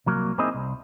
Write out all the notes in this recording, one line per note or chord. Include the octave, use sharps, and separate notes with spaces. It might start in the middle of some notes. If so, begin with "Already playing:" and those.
C2 F#3 A#3
A#3 C4 D#4 E4 G#4 D#5
C2